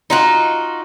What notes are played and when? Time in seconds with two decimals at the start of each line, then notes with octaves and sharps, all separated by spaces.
0.10 D#4 F4 F#4